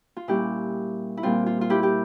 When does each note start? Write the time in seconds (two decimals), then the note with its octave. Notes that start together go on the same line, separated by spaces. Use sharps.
0.17 F4
0.28 A#2 G3 C#4 E4 G4
1.17 E4
1.23 A#2 G3 C4 F4
1.46 F4
1.61 F4
1.70 E4 G4
1.83 G4